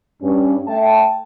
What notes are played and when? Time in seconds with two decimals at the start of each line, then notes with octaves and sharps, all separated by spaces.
0.22 G2 C#4
0.68 A3 E5 G5 A5